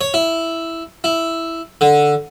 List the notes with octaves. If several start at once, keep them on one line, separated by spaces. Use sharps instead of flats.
C#5
E4
E4
D3